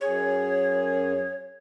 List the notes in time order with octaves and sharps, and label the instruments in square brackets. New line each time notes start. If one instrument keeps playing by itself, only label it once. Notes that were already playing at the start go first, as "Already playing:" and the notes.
[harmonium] F#2 G#4 [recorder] C#5